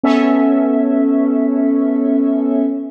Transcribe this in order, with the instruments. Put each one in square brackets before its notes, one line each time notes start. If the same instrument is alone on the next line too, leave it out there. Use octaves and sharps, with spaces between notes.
[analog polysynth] B3 C#4 A4 E5